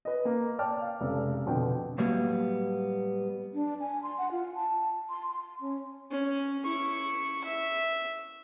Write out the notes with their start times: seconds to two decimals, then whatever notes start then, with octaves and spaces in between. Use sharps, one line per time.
0.05 B4 D#5
0.25 A#3
0.59 C#5 D5 G5 A5 D6 F6
0.81 F5
1.01 F1 C#3 G#3 A4
1.46 F2 B2 D3 G5
1.98 A2 F#3 G3 A#3 B3
3.54 D4
3.80 G#5
4.03 C6
4.18 F#5
4.32 F4
4.55 A5
5.09 C6
5.28 C6
5.61 C#4
6.11 C#4
6.64 E4 C#6
7.44 E5